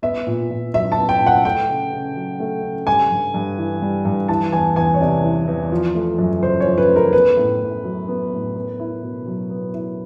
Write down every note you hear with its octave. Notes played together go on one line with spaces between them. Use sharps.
B3 E5
A#2
A#2
F#3 E5
A5
B3
G5
A#2
F#5
A3 G5
C#3
C#3
F#3
A3
C#3
G3 G#5
G2
G2
E3
G3
G2
E3 A5
E2 G#5
E2 G#5
C#5
C3 D5
E3
E2
F3
A3
F#2
C#3 C5
C#5
F3
B4
A3
A#4
B3 B4
A2
A2
F#3
B3
A2
B3
E4
B2
F#3
B3
E4